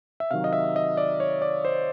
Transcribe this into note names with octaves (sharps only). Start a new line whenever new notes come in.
E5
C3 D#3 F#3 F5
D#5
E5
D#5
D5
C#5
D5
C5